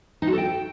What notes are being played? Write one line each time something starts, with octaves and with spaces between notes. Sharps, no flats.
D#4
F#4
A4
G5